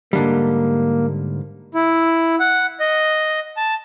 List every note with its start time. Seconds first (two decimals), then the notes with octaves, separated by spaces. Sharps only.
0.13 G#2 D3 G3 A#3
1.74 E4
2.40 F#5
2.80 D#5
3.57 A5